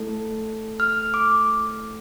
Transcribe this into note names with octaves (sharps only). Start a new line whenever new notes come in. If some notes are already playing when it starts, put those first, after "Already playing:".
Already playing: A3 E4 A4
F6
D6